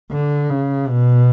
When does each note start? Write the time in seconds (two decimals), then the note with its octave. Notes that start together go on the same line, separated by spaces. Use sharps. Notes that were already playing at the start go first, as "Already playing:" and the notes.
0.12 D3
0.51 C#3
0.89 B2